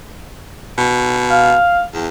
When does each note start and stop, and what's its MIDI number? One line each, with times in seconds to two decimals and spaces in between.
0.78 1.55 47
1.30 1.82 77
1.94 2.08 40